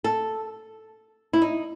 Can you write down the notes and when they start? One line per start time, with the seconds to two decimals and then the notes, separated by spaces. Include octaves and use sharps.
0.04 A4
1.33 E4
1.42 D#4